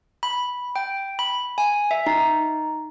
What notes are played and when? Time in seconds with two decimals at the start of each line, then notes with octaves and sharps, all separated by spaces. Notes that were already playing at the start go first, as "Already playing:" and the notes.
0.23 B5
0.76 G5
1.19 B5
1.58 G#5
1.91 E5
2.06 D#4